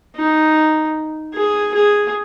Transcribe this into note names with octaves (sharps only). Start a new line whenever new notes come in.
D#4
G#4
G#4